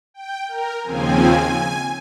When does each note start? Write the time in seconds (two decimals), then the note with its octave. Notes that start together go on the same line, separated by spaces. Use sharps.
0.14 G5
0.48 A#4
0.83 D#2 C#3 F3 C4 G#5